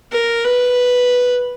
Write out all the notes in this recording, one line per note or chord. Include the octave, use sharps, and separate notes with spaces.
A#4
B4